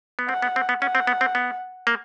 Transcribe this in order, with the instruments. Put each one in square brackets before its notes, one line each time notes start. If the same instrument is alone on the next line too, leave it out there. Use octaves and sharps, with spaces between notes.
[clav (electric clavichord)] B3
[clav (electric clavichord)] C4 [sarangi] F#5
[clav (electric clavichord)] B3
C4
B3
[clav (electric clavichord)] C#4 [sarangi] F#5
[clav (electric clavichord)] C4
B3
C4
B3
A#3